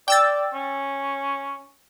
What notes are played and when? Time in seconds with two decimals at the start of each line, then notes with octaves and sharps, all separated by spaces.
0.08 D5 G5 E6 A6
0.54 C#4